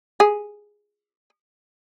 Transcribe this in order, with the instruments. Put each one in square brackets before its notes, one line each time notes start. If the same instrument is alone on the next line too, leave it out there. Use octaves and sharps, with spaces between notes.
[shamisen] G#4